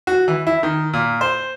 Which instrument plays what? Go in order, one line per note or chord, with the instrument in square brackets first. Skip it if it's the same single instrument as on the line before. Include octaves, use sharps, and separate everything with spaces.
[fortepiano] F#4
E3
E4
D#3
A#2
C5